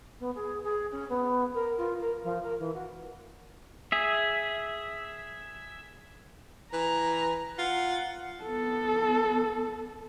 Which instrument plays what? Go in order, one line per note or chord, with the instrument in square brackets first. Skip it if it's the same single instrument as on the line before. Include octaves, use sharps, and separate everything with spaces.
[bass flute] B3
G#4
G#4
C#4
B3
A#4
F4
A#4
F3
A#4
E3
F#4
[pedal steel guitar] G#4 E5
[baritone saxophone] E3 [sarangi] A#5
[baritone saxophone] F4 [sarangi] F#5
[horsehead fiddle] B3 A4